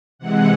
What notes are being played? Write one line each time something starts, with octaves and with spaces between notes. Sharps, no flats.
C3 E3 G#3 F#5